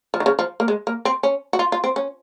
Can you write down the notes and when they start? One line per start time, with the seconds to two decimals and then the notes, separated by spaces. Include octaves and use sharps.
0.14 F3
0.20 D#3
0.26 C#3
0.39 F3
0.60 A#3
0.68 G#3
0.87 A#3
1.05 C4
1.23 C#4
1.53 F#4
1.59 F4
1.72 F4
1.84 C4
1.96 C#4